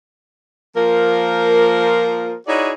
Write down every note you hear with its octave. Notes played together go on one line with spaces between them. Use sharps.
F3 A#3 A#4
D#4 E4 F#4 G#4 C#5 D5